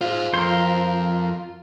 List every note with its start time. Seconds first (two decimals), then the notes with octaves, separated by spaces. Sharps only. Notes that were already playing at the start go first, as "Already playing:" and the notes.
0.01 F4 G#4 C5
0.34 F2 A#4 C5